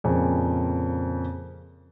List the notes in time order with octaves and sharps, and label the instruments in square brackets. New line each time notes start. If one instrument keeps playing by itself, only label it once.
[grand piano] F2 A#2 C#3 A#3 C4 G#5